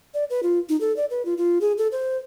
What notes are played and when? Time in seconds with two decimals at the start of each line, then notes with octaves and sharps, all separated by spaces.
0.14 D5
0.30 B4
0.43 F4
0.69 D#4
0.81 A4
0.97 D5
1.10 B4
1.25 F4
1.37 F4
1.61 G#4
1.78 A4
1.92 C5